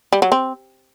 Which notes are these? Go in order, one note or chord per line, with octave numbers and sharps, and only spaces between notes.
G3
F#3
C4